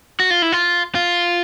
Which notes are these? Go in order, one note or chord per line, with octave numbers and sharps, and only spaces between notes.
F#4
F4
E4
F4
F4